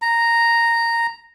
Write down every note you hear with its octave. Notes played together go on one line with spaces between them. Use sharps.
A#5